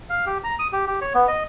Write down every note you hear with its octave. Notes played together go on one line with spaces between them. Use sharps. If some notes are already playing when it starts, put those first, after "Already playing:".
F5
G4
A#5
D#6
G4
G4
C#5
B3
D#5